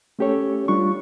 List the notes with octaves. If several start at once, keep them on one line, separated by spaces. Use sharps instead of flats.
A3 C#4 G4 A4 C#5
G3 D4 F4 C#6